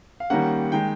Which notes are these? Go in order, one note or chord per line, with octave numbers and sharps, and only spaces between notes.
F5
D#3 G3 A#3 C#4 F#5
D#3 G#3 G5